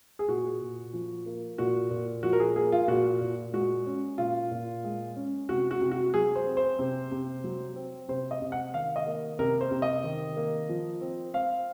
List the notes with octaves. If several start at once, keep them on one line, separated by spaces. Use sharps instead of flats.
G#4
A#2 F#4
A#2
F3
A#3
A#2 F#4
A#2
F3 F#4
A#4
G#4
A#3 G#4
F4
A#2 F#4
A#2
G#3 F#4
C#4
A#2 F4
A#2
G#3
C#4
C3 F#4
F#4
C3
F#4
F#3 G#4
C5
C4
C5
C3
C3
F#3
C4
C3 C5
D#5
C3
F#5
D#3 F5
D#5
A#3
C3 A#4
C5
C3
D#5
D#3
A#3
F3
C4
C4 F5